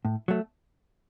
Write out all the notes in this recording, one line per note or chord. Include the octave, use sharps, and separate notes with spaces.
A2
F#3 A3